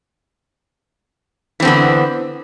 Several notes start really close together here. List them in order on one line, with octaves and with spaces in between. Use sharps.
E3 C4 D3 B3